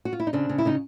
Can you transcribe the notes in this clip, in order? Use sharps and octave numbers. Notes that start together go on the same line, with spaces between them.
F#4
F4
E4
D#4
C#3 C4 D4
C#3
E4
C#3 D#4